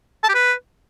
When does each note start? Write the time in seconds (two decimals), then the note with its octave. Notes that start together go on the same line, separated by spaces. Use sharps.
0.24 A5
0.29 G4
0.35 B4